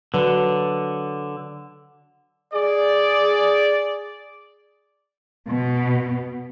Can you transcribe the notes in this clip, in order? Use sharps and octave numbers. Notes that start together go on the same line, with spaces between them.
D3 F#3 B4
G#4 D5
B2